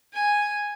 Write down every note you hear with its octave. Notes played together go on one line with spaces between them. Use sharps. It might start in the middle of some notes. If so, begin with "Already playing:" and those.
G#5